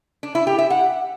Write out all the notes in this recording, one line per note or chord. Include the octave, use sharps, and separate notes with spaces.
D4
E4
G4
E5
F#5